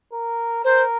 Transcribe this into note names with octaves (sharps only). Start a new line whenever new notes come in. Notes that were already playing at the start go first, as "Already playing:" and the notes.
A#4
A#4 C5